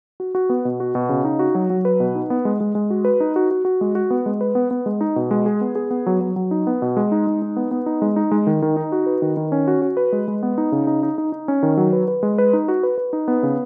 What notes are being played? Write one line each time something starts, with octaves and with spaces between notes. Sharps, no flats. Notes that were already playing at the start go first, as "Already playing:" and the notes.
F#4
F#4
B3
B2
F#4
B2
C#3
D#4
F#4
F#3
F#3
B4
B2
D#4
B3
G#3
G#3
G#3
F#4
B4
D#4
F#4
F#4
F#4
G#3
F#4
B3
G#3
B4
B3
B3
G#3
D#4
B2
G#3
G#4
B3
G#4
B3
F#3
F#3
F#3
D#4
B3
B2
G#3
D#4
G#3
D#4
B3
B3
D#4
G#3
D#4
G#3
D#3
D#3
D#4
F#4
B4
D#3
D#3
C#4
F#4
F#4
B4
G#3
G#3
B3
D#4
C#3
D#4
D#4
D#4
D#4
C#4
D#3
F#3
B4
B4
G#3
B4
D#4
F#4
B4
B4
D#4
B3
C#3